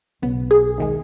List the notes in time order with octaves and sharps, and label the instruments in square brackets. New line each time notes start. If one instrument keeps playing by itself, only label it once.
[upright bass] B1 [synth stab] C#3 B3
[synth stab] G#4
D#2 D#3 G#3